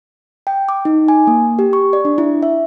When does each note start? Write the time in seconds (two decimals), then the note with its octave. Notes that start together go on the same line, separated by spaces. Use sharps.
0.47 G5
0.69 D6
0.85 D#4
1.08 G#5
1.27 A#3
1.59 G4
1.73 C#6
1.93 D5
2.05 D4
2.18 E4
2.42 E5